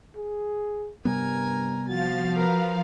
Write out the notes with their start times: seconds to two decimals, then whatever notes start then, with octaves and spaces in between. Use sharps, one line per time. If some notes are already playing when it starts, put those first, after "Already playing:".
0.16 G#4
1.05 G2 C3 G3 B3 A#4 G#5 A#5
1.88 F3 F#4 F5 A6
2.37 A#4 B4 A#5